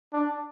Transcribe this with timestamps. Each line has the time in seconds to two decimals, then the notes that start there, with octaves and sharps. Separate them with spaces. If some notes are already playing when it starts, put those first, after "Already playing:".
0.13 D4